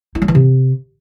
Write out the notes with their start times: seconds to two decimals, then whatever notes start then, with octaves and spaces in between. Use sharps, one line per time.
0.15 E4
0.22 F#3
0.28 E3
0.35 C3